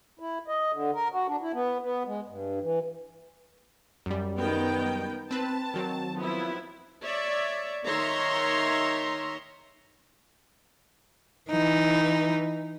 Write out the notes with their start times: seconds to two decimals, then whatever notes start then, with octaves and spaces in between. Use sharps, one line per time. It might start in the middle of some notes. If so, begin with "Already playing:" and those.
0.19 E4
0.48 D#5
0.72 D3
0.94 A#4
1.12 F#4
1.28 D4
1.41 E4
1.53 B3
1.81 B3
2.07 G#3
2.28 G2
2.62 E3
4.06 F#2 G3
4.37 D#3 B3 G5
5.31 C4 B4 A5
5.74 D#3 F#3 C4
6.16 F3 B3 E4
7.01 C#5 D5 E5
7.86 D#3 C#5 E5 A#5 C6
11.50 E3 D#4